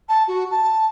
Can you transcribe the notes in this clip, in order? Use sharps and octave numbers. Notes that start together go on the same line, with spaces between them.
A5
F#4
A5